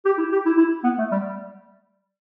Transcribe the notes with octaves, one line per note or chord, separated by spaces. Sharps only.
G4
E4
G4
E4
E4
B3
A3
G3